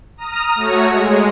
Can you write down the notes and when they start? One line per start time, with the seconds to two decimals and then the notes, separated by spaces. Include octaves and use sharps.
0.17 A#5 D#6 F6 A#6
0.56 A3 F#4 C#5
0.90 G#3